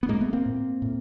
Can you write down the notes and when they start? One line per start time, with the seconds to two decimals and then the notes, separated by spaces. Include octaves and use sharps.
0.03 B3
0.08 A2 G#3 A#3
0.21 A3 B3
0.33 A#3 C4
0.46 A2
0.82 A2